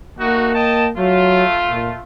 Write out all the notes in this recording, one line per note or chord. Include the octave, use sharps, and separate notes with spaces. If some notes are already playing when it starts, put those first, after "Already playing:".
A3 A#3 D#4 F#4
D#5 G5 A5
F#3 A3 F4
A#2